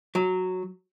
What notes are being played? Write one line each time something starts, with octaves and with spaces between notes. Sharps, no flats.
F#3